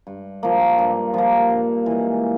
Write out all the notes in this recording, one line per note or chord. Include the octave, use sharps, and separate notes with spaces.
G2
F3 A#3
G2
F3 A#3
G2
E3 G#3